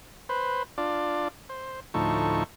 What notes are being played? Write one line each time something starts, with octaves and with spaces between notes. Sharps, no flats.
B4 C5
D4 F4 D5
C5
D2 A2 F3 D#4 A4 C#6